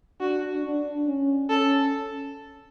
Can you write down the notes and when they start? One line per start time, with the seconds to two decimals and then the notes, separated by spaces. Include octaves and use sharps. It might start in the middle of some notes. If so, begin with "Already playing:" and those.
0.20 D4 F#4
0.64 D4
1.07 C#4
1.50 C#4 A4